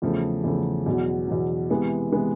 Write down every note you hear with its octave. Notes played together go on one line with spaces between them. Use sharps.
E2 C#3 F3 A3
E2 C#3 F3 A3
E2 B2 F#3
E2 B2 F#3
C3 E3 G#3 B3
C3 E3 G#3 B3